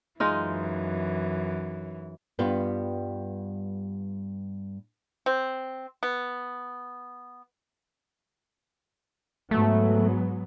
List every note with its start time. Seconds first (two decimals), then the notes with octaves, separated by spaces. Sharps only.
0.20 F#2 E3 G#3 D#4 F4
2.39 G2 G3 B3 F4
5.26 C4
6.03 B3
9.51 G#2 F#3 A3 B3